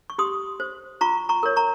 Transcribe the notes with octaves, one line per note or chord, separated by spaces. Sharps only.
C#6
G4 C6 D#6
C5
F4 A#5 C#6
A#5 C#6
A#4 C#5
A#5 C#6